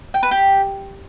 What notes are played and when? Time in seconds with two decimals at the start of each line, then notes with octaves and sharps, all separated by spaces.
0.14 G5
0.23 B4
0.31 G4